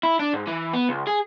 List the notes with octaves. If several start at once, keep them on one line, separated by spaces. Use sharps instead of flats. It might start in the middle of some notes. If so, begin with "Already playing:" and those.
E4
D4
G#2
E3
B3
C#2
G#4